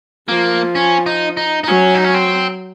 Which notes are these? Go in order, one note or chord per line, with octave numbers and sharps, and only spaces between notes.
F3 A#3
C#4
D#4
D#4
D#4
F#3 C#4
D#4
C#4
C4